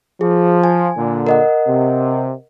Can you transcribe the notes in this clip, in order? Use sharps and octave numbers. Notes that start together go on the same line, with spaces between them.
F3 G#4
G#5
A#2 D3
A#4 D#5 F#5
C3